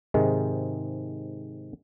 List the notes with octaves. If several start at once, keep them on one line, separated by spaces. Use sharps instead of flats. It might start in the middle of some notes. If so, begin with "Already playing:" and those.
G#2 C3 D#3 G#3